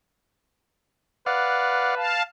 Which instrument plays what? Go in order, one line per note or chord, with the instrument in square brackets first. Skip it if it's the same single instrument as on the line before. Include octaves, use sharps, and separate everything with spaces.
[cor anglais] B4 [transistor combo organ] D5 F5 F#5
[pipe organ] F5 A5